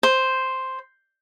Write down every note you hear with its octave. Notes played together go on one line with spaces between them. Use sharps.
C5